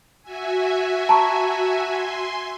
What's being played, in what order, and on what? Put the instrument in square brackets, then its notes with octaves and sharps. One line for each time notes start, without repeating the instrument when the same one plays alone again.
[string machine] F#4 E5 G#5
[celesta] A5 A#5 C#6
[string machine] G#5 C6